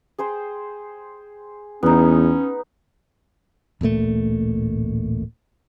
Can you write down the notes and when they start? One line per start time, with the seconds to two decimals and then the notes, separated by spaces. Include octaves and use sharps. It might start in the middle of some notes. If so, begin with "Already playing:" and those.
0.18 G#4 C5 G5
1.83 E2 B3 C#4 D#4
3.81 D1 A1 A#2 A3